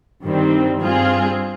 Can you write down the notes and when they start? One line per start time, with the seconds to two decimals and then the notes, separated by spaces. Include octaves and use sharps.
0.24 G2 D#3 G3 C4
0.81 G2 G3 C4 F4 G#4